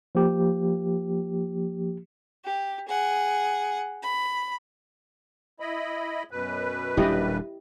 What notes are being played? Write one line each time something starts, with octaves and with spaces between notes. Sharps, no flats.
F3 A#3 G4
G4
G#4 F#5
B5
E4 D#5 B5
F#2 B2 B4
D#1 G3 D4 E4 G4 D#5